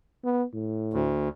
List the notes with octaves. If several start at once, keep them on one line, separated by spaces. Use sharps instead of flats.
B3
A2
D2